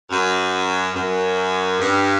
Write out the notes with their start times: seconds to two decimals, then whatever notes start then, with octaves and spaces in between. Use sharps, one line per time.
0.10 F#2
0.95 F#2
1.79 G2